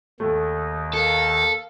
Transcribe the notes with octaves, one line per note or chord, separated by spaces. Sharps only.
D#2 D#3 A3
A4 A#4 F5